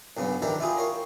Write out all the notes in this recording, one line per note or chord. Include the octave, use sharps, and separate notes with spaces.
B1 G2 C#3 B3
D#3 E3 D4 G4 A4 A#4
E4 F4 G4 G#4
A#4 C#5 F5